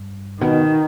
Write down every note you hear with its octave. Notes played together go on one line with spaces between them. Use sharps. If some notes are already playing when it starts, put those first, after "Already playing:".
Already playing: G2
B2 D#3